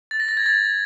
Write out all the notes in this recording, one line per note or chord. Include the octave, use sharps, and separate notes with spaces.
A6
A#6
A6
G#6
A6